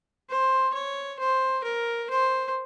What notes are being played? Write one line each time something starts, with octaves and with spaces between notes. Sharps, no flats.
C5
C#5
C5
A#4
C5